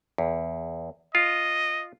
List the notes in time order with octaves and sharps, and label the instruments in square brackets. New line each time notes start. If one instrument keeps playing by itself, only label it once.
[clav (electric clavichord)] E2
[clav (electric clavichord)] F4 [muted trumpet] D#5